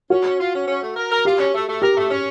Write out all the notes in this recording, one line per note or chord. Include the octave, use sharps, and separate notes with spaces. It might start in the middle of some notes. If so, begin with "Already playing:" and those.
C#4 F#4
C#4
F4
C#4
C#4
A3
A#4
A#4
F4 G4
C#4
A3
A3
G4 A#4
A3
C#4